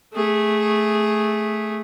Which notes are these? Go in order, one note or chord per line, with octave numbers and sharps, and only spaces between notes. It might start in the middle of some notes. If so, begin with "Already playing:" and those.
A3 G#4